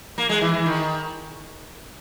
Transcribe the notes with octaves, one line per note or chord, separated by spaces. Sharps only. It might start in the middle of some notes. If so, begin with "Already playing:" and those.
A#3
G#3
E3
E3
D#3